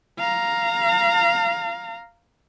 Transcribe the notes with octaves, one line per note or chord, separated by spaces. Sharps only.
F5 A#5